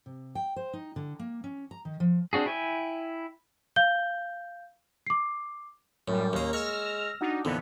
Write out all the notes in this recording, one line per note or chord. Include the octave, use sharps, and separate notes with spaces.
C3
G5
C5
D#4
D3
A#3
C#4
A#5
D#3
F3
C4 D4 F#4 G#4
E4 G5 G#5
F5 G6 G7
D6 C7
F#2 A2 G3 C#4
D#2 A#3 A#5
G#3 C#5 E6 F6 A#6
D4 D#4 F#4
F2 A#2 D3 E3 B3